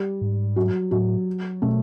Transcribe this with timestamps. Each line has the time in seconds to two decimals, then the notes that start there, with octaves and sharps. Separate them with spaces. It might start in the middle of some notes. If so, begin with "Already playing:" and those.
Already playing: G3
0.21 G#2
0.56 F#3
0.91 A2 F#3
1.62 B2 A3